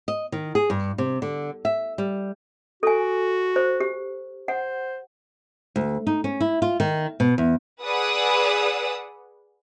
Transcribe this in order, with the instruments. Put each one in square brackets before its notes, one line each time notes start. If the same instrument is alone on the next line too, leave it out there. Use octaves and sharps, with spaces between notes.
[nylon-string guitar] D#5
D#3
G#4
G2
C3
D3
E5
G3
[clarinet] F#4 [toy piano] A4 G#5
[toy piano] C5
G4
[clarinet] C5 [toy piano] F#5
[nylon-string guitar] D2
D#4
C#4
E4
F4
D#3
B2
E2
[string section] G#4 B4 D5 F#5 D#6 E6